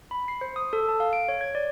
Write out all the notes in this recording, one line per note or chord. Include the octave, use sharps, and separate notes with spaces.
B5
C7
C5
D#6
A4
A5
F5
D7
C#5
G#6
D5